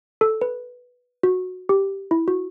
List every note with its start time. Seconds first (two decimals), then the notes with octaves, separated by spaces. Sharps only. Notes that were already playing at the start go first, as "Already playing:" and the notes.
0.21 A4
0.41 B4
1.23 F#4
1.69 G4
2.11 E4
2.28 F#4